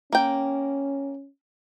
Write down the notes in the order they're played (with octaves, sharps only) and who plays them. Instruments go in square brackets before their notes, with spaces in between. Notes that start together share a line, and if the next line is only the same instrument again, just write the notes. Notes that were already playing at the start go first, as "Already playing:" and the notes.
[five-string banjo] A#3 G5 [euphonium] C#4